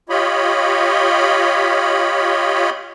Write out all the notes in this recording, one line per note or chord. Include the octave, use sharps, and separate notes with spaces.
F4 G4 C#5 D#5 B5